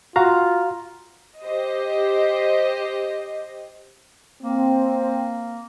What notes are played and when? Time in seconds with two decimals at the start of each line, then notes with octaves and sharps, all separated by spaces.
0.16 F4 F#4 F5 A#5
1.42 G4 C5 D#5
4.43 A#3 C4